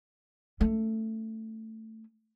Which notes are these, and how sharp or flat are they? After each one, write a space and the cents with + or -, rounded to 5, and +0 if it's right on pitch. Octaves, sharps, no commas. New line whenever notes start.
A3 +10 C#4 +15